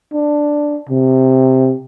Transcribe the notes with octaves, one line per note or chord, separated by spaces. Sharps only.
D4
C3